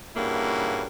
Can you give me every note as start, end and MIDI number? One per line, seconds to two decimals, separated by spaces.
0.16 0.85 43
0.16 0.85 46
0.16 0.85 49
0.16 0.85 58
0.16 0.85 64
0.16 0.85 66